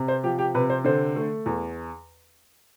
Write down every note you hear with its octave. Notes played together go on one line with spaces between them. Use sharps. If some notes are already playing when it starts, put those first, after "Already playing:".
Already playing: C3
C5
F3 G4
G4
C3 B4
C5
D3 C5
A3
E2